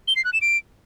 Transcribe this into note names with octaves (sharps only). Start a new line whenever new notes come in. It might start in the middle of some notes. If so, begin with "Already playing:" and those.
G7
C7
F#6
E7
D7